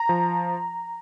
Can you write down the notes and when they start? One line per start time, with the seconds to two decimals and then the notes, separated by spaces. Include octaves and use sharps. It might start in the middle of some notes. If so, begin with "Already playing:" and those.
Already playing: A#5
0.09 F3